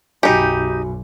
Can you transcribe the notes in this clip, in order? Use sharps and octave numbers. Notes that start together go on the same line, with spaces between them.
B1 F#2 D#4 F#4 G4 G#5